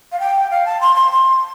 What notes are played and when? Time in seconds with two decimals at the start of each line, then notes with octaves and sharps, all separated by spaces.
0.12 F5
0.20 G5
0.51 F5
0.65 A5
0.81 C6
0.95 C6
1.12 C6